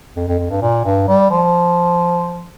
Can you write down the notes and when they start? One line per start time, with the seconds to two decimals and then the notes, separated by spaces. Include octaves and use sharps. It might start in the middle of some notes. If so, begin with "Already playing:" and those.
0.16 F2
0.28 F2
0.39 F2
0.50 G2
0.62 A#2
0.85 G2
1.08 G3
1.31 F3